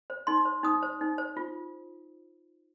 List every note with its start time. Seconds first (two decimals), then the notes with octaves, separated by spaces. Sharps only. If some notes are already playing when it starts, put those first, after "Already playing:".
0.10 C5
0.27 D#4 C6
0.45 C5
0.63 D#4 D#6
0.83 C5
1.01 D#4
1.18 C5
1.37 F4